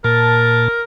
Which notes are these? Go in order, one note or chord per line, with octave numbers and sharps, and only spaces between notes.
A#2 A#4 A5